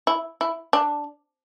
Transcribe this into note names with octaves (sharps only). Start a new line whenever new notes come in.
E4
E4
D4